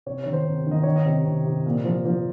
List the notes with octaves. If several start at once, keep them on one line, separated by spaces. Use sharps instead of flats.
C3 C#5
D#3 C#5
C5
C3
D#3 D#5
D#3 C#5
D#5
C3
C3
C3
A#2
F3
F3